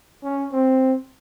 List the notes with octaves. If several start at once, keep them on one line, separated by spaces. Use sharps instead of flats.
C#4
C4